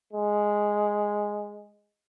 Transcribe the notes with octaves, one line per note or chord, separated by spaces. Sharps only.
G#3